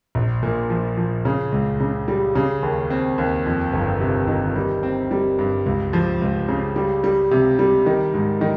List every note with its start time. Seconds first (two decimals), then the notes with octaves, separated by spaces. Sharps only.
0.15 A#1
0.43 A#2
0.70 F3
0.97 F3
1.25 C#3
1.52 C#2
1.80 C#3
2.08 G3
2.35 C#3
2.63 D#2
2.90 C4
3.18 D#2
3.46 F2
3.73 G1
4.01 C3
4.28 D#3
4.56 G3
4.83 C4
5.11 G3
5.39 G2
5.66 C#2
5.93 F3
6.22 C#2
6.49 C#3
6.76 G3
7.04 G3
7.31 C3
7.59 G3
7.86 D#3
8.14 G#2
8.41 D#3